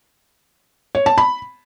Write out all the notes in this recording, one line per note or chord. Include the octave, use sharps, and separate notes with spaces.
C#5
A5
B5